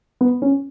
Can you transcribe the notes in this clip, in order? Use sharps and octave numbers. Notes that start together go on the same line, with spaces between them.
B3
C#4